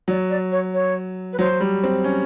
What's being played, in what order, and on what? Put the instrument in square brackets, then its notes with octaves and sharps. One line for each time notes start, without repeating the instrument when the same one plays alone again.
[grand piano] F#3 [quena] D5
[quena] D5
C#5
C#5
B4
[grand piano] F#3 [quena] C5
[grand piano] G3
C4
C#4